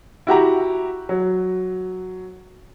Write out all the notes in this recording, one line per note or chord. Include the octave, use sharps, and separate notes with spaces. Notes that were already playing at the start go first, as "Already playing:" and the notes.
E4 F#4 G4 A#5
F#3